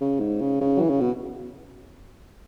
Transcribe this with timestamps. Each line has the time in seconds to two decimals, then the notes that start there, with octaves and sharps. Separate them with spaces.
0.01 C#3
0.20 G#2
0.41 C#3
0.61 C#3
0.77 F#3
0.80 E3
0.90 C#3
1.01 B2